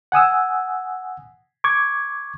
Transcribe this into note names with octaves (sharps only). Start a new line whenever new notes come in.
F#5 G#5 D#6 E6
C#6 D6 G#6